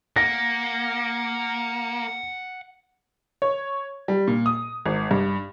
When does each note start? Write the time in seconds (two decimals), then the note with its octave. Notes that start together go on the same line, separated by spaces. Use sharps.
0.16 A#3 F#5 A#6
3.42 C#5
4.08 G3
4.27 A#2
4.46 D#6
4.86 G#1
5.11 G2